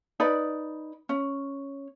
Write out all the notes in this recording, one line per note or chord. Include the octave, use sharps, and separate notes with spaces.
D#4 B4 D5 B5
C#4